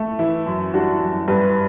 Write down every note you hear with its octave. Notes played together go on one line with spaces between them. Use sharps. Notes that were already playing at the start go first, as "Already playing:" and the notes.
Already playing: A3
E3 E4
F#2
G3 D4 F#4
F#2
G2 G4 B4